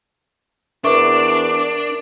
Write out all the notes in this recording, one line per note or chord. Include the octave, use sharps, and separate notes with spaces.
E2 D4 A#4 E5 C#6 D6